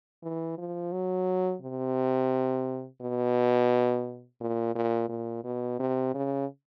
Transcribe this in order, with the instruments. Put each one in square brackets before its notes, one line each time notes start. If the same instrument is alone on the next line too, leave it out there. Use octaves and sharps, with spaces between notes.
[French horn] E3
F3
F#3
C3
B2
A#2
A#2
A#2
B2
C3
C#3